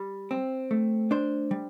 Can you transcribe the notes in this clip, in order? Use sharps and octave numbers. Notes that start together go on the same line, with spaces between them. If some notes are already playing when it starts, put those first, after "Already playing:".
Already playing: G3
C4
A3
D4 C5
G3